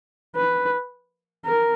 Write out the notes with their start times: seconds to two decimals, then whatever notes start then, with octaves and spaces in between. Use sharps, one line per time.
0.36 B4
1.46 A#4